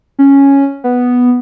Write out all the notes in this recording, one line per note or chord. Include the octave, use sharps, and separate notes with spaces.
C#4
B3